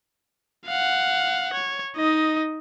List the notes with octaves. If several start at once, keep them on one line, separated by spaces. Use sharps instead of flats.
F5 F#5
C#5
D#4 D#5